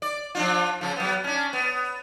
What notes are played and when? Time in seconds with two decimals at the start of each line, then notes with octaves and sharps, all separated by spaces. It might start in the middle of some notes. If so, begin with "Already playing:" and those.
0.02 D5
0.35 F3 D4 F4
0.81 C#3 F3
0.96 F#3 B3
1.24 C#4 D4
1.53 B3